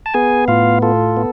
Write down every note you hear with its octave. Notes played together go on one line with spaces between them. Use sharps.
A5
B3 G#4 G#5
A2 F4 F5
F4 A4
B3